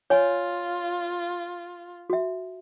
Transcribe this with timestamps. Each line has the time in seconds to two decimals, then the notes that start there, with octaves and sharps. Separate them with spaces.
0.10 F4 C#5 G#5
2.10 F#4 E5